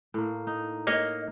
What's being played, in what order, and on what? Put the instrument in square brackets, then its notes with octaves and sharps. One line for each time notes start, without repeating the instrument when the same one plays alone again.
[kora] A2 A#3
D#4
[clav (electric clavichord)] A#3 C#5 [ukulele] D#5